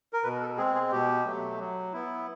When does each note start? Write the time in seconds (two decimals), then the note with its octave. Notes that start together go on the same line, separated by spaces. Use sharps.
0.13 A#4
0.24 B2 B4
0.41 A4
0.57 G#3 C4 G#4
0.75 G#4
0.91 B2 G4
1.26 F#3 A3
1.59 F#3
1.93 B3 E4